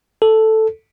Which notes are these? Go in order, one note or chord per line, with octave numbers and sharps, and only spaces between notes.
A4